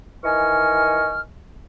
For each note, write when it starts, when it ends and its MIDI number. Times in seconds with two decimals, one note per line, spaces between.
0.24 1.20 51
0.24 1.20 52
0.24 1.20 75
0.24 1.20 80
0.24 1.20 85
0.24 1.20 89